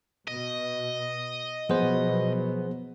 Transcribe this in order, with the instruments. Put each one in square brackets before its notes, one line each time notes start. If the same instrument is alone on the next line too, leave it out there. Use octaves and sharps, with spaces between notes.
[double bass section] B2 [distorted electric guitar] D#5
[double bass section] B2 F#3 [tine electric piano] F3 G#4 C5 [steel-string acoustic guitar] B3